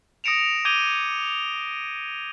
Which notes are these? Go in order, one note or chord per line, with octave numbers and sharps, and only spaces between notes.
D#6 A#6 C#7 D7 E7 F7
D6 G6 G#6 D#7 F7 G7